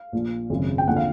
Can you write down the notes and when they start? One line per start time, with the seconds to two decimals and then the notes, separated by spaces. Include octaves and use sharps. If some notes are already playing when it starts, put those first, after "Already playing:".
Already playing: F5
0.12 A#1 A#2 F3
0.50 G#1 F#2 C#3
0.78 G5
0.87 D#2 D3 F3 F#5
0.96 F5